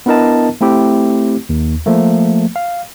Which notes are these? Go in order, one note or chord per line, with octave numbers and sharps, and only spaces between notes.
B3 D4 E4 A#4 D#5 A5
A3 C4 E4 G4
D#2
F3 A3 A#3
F5